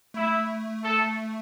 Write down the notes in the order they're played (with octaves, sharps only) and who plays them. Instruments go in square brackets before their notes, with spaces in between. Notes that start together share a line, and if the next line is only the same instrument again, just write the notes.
[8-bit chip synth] A3 [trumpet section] E4
[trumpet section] A4